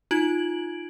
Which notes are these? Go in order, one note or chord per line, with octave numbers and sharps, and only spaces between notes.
D#4 F4 G#6 D7 F#7